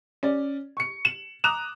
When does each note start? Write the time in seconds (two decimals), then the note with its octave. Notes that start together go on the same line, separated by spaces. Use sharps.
0.23 C#4 D5
0.77 C#6 C#7
1.05 E7 F#7
1.44 A#5 D6 D#6 F#6 E7 F7